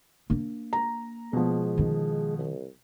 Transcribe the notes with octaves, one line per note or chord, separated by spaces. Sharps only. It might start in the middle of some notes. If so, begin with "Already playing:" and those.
A#3 D4
A#5
B2 F3 G#3
D#3 D#4
C2